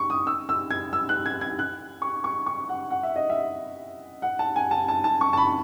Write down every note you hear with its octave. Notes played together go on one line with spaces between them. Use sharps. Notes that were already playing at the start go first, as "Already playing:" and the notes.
Already playing: C#6
D#6
E6
E6
G#6
E6
F#6
G#6
G#6
F#6
C#6
C#6
C#6
F#5
F#5
E5
D#5
E5
F#5
A5
G#5
A5
A5
A5
C#6
A5
B5